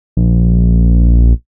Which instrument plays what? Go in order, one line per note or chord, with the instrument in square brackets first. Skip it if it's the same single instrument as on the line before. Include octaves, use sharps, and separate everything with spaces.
[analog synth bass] A#1